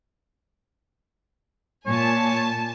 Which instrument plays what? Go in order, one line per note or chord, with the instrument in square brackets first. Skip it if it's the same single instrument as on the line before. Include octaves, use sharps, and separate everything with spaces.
[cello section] A#2 [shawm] C#5 [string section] G#5 A5